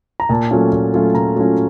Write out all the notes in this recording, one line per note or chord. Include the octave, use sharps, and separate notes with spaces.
A#5
A#2 A5
F#3 A3 C#4 F4
A#2
F#3 A3 C#4 F4
A#2 A#5
F#3 A3 C#4 F4